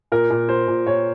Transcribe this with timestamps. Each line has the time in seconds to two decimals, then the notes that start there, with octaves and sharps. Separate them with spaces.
0.12 A#2 A#4
0.30 A#2
0.49 A#2 C5
0.68 A#2
0.86 A#2 C#5